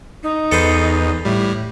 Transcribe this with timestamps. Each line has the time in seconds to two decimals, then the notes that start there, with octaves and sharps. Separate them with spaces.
0.23 D#4
0.52 E2 A4 B4 C5
1.25 A2 G3